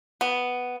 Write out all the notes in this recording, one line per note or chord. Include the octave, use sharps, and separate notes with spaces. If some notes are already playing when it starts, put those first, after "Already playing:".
B3